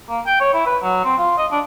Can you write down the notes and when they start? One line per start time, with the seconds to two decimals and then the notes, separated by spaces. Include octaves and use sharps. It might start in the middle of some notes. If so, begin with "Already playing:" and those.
0.09 A#3
0.26 G5
0.41 C#5
0.54 E4
0.66 B4
0.83 F#3
1.04 C4
1.18 F4
1.38 D#5
1.52 D4